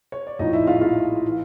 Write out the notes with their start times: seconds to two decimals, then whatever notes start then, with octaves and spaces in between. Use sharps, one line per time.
0.12 C#5
0.27 D5
0.39 A#1 A2 F3 D#4 D#5
0.53 E4 E5
0.67 F4 F5
0.76 E5
0.81 F4 F5
1.28 E3